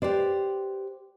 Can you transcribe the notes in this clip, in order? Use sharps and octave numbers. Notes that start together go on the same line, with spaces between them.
G4 B4 C5 D5